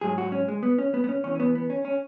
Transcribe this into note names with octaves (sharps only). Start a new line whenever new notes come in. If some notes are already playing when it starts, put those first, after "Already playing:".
G#2 F#3 G#4
F#4
C#4
G#3
B3
C#4
B3
B3
C#4
E2 E3 C#4
C#4
B3
B3
C#4
C#4